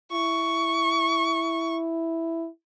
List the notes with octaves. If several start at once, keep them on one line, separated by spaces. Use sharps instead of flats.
E4 C#6